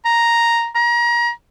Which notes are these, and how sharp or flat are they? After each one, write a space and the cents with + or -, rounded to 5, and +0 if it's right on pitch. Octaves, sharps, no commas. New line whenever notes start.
A#5 +0
A#5 +30